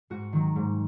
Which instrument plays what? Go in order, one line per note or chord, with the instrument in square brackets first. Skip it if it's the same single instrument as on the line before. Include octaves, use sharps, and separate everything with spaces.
[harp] G#2 F#4
D#3 F#3
G#2